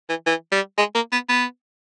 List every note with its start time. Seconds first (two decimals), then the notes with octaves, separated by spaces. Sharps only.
0.09 E3
0.27 E3
0.52 G3
0.78 G#3
0.95 A#3
1.13 B3
1.29 B3